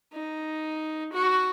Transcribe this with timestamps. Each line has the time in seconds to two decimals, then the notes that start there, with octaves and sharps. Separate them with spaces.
0.13 D#4
1.13 F#4